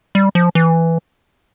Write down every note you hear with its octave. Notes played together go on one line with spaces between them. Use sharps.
G3
F3
E3